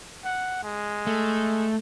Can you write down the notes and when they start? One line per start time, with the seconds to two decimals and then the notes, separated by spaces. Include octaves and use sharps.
0.24 F#5
0.63 G#3
1.07 A3